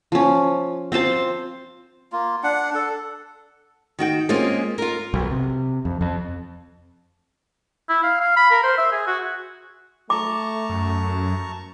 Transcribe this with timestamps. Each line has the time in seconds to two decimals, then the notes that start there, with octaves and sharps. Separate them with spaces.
0.12 F3 C#4
0.92 C4 F4 C5 A5
2.12 A#3 F4
2.43 D4 F#5
2.75 A4
3.99 D#3 F#4 G5
4.29 G#3 A#3 C4 C#4 F4 G#4
4.78 F4 A#4
5.14 B1
5.31 C3
5.85 F2
6.01 F2
7.89 E4
8.03 F5
8.20 F5
8.37 B5
8.51 A#4
8.63 C5
8.78 E5
8.92 G#4
9.07 F#4
10.10 A3 A5 A#5 C#6 D6
10.70 F#2